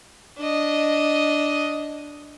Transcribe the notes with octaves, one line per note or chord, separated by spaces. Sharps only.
D4 D#5